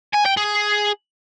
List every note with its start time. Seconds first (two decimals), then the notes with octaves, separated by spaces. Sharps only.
0.14 G#5
0.26 G5
0.37 G#4